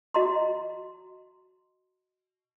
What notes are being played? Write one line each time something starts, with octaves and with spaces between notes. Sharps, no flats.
F#4 D#5 A#5 C6